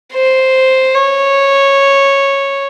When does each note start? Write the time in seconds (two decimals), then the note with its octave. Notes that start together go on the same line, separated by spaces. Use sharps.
0.13 C5
0.94 C#5